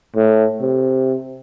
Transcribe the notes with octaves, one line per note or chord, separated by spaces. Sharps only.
A2
C3